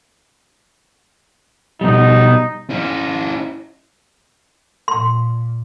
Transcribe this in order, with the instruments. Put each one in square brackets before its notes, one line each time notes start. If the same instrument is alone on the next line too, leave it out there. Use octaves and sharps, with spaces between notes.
[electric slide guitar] B2 G3 [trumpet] D#4
[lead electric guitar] C#4 E4
[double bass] A#2 [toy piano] C6